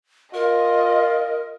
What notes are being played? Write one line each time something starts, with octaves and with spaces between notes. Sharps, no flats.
F4 A#4 D#5